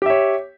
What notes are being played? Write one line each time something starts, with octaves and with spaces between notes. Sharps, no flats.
G4 C#5 E5